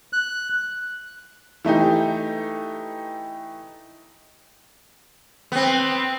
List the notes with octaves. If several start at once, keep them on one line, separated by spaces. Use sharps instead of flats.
F#6
E3 A3 D#4 G4
B3 C4